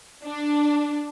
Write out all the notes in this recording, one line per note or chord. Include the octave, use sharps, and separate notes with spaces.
D4